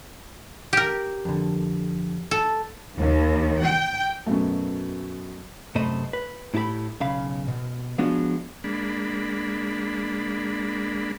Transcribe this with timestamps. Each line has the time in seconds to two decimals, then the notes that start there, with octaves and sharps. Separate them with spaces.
0.73 G4 A#4
1.25 F2 D3
2.31 A4
2.98 D#2
3.63 G5
4.26 F#2 B2 F#3 A3
5.75 F#2 C3 A3 C5 D#5 B5
6.13 B4
6.54 A2 E4 G4 A5 B5
7.00 B1 C#3 F5 B5
7.48 B2
7.98 F3 G#3 B3 D4 F4 F#4
8.64 G#3 A#3 D4 B5